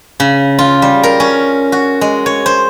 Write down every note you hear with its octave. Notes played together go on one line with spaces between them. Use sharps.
C#3
F4
G3
A#4
C#4
F#4
G#3
C#5
C5